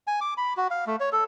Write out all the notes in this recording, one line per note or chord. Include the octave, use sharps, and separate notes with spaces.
G#5
D6
B5
F#4
F5
A3
C#5
A4